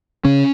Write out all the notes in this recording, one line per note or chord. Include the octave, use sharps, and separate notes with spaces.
C#3 C#4